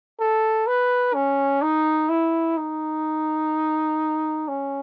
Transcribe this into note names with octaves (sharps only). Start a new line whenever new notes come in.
A4
B4
C#4
D#4
E4
D#4
C#4